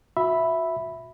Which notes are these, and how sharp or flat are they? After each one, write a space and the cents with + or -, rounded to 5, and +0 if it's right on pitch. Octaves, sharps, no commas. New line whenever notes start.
F#4 -25 E5 +0 B5 +0